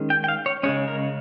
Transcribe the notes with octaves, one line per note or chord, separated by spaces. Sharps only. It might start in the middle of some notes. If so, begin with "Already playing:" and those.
Already playing: D#3 G#3 C#4
G5
G5
F5
C#5
C#3 G#3 C#4 C#5
A#4